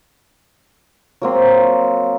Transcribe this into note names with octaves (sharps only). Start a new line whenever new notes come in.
F#3 A#3 C4